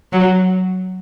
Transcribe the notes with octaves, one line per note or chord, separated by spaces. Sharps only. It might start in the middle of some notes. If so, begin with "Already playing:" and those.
F#3